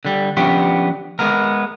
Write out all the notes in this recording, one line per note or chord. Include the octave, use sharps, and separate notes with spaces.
D3 G3
F3 B3 C#4 D4 G4
G#3 B3 A#4